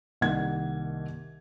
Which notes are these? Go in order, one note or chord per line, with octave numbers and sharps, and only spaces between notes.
C2 D#3 A#3 F#5 G#6